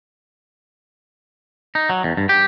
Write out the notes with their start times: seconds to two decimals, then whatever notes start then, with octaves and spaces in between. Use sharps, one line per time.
1.75 D#4
1.90 F#3
2.04 E2
2.17 G2
2.29 G4